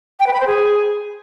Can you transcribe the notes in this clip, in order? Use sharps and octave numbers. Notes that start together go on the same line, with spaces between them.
G5
B4
B5
C5
G#4